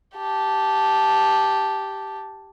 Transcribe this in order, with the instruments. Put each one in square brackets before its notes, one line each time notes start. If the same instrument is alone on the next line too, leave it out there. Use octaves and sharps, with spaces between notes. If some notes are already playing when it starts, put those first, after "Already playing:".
[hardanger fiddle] G4 A5